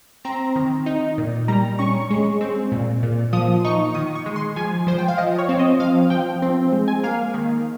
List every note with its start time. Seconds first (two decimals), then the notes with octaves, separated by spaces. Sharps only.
0.25 C4 A#5
0.56 D#3
0.86 D#4
1.18 A#2
1.48 G3 A#5
1.79 C#4 C#6
2.10 G#3
2.41 C4
2.72 A#2
3.03 A#2
3.33 F3 D#6
3.65 D#4 C#6
3.94 D#3 D#6
4.15 C#6
4.26 G#3
4.36 C6
4.56 F3 G#5
4.87 F3 C5
4.98 G5
5.08 F5
5.18 F3 D#5
5.38 C#5
5.49 C4
5.59 D#5
5.80 F3 F5
6.10 F3 G5
6.42 C4
6.72 G#3
6.88 G#5
7.03 A#3 F5
7.34 D#3